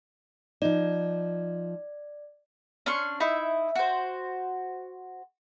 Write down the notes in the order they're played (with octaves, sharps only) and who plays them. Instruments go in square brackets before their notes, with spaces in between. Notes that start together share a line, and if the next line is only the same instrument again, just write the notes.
[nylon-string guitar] F3 D#4 [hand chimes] D5
[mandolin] C#4 D4 C6 C#6
D#4 E4 E5
F#4 C5